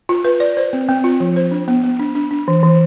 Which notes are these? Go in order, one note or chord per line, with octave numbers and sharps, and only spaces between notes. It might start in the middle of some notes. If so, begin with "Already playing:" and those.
F4
B4
D5
C5
C4
C4
F4
F3
C5
D4
B3
B3
D4
D4
D4
E3
E3